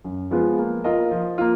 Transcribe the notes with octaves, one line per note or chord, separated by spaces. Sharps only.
F#2
F3 G#3 B3 F4
A#3
F4 A#4 D#5
F3
A#3 F4